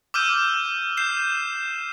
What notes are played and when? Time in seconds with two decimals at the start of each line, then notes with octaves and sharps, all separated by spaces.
0.14 D6 E6 F6 G6 D#7
0.97 G6 C7 E7